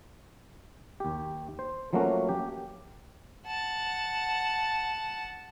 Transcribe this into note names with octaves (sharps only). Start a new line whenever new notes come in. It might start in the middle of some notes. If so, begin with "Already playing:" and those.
D#2 G4
C5
F3 F#3 A3 A#3 C#4 F#4
G4
F#5 A5